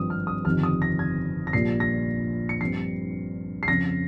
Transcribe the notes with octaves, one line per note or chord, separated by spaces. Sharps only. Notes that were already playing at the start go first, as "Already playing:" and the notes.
Already playing: G#1 G2 F3 C4 D#6
F6
D#6
G1 F2 C3 D#3 F6
D#6
A#6
G#6
A#6
A#1 A#2 G3 A#3 C7
A#6
C#7
G2 F3 C4 C7
C7
F2 C#3 F3 A#6